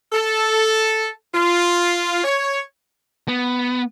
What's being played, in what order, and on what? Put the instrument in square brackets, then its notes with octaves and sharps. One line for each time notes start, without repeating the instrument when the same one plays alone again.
[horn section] A4
F4
C#5
[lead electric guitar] B3